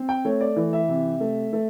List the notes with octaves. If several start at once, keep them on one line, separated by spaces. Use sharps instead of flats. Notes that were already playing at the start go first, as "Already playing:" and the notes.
Already playing: C4
G5
A3 C#5
D5
E3
E5
C3
A3
A3